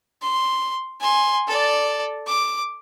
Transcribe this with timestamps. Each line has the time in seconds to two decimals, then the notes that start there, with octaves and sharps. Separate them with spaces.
0.22 C6
1.00 G#5 C6
1.48 A4 D5
2.27 D6